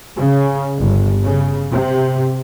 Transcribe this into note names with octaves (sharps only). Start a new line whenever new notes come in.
C#3
G1
C#3
C3